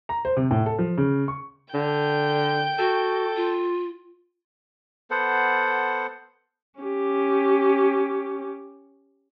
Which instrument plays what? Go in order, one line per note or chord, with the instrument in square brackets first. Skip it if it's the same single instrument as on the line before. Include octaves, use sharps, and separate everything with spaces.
[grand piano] A#5
C5
C3
A2
A4
F3
C#3
C#6
[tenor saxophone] D3 [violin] G5 G6
[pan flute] F#4 [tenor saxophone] A4
[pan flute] F4
[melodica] B3 A4 C5 F#5
[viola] C#4 G4